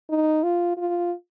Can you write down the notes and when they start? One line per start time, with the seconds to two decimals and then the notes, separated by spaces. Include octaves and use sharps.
0.10 D#4
0.43 F4
0.77 F4